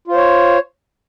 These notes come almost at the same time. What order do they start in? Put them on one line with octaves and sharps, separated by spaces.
F4 C5 C#5